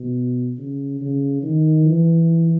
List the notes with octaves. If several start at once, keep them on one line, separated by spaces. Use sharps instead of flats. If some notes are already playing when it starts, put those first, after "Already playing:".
Already playing: B2
C#3
C#3
D#3
E3